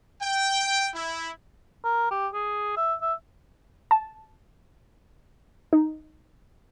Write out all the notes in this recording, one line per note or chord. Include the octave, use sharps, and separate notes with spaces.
G5
E4
A#4
G4
G#4
E5
E5
A5
D#4